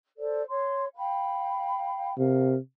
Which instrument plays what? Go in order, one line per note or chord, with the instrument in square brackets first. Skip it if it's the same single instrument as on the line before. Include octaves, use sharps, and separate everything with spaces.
[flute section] A4 C5 D5
C#5 C6
F5 G5 B5
[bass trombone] C3 [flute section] A#4 F5